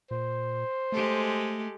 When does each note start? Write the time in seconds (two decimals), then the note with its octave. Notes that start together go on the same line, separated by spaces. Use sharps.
0.11 A#2 C5
0.92 G#3 A3 G4 A4